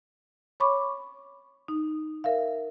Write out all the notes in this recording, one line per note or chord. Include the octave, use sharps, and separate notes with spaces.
C#5 B5 C#6 D6
D#4
A#4 E5 F5